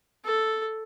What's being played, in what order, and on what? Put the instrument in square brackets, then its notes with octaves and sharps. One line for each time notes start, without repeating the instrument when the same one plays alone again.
[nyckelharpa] A4